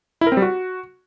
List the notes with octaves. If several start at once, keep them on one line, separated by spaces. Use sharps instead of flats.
E4
A#4
C4
G3
F#4